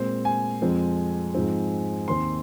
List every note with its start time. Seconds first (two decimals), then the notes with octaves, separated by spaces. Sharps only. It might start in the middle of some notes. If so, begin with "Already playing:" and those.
Already playing: A#2 G#3 C4 C5
0.25 G#5
0.62 F2 F3 G#3 C4
1.35 G#2 F3 C4
2.08 D#2 D#3 C4 C6